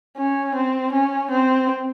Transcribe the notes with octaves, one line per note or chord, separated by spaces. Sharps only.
C#4
C4
C#4
C4